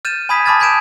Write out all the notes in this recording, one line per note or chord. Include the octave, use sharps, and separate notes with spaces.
F6 G6 A6 D#7 E7
G#5 B5 D#6 G#6 B6
A5 B5 D6 F6 G#6 A6
A5 B5 G6 G#6 D7 E7